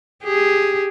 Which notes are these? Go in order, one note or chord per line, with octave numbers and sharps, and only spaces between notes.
G4 G#4